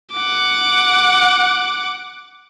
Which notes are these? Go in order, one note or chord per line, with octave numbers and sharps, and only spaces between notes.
F#5 D6